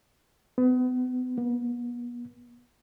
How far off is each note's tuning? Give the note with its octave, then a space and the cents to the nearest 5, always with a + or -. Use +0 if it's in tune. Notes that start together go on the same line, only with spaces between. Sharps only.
B3 +35
B3 -40